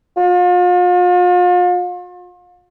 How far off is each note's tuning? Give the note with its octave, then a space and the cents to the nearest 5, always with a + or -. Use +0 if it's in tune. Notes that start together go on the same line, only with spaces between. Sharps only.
F4 +40